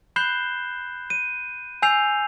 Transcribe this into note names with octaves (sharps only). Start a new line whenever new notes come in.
B5 F#6 G6 C7 E7 G7
D#7
G#5 E6 G6 C7 F7